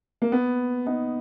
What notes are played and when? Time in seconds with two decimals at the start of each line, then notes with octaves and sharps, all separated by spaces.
0.22 A#3
0.32 B3
0.86 B3 D#4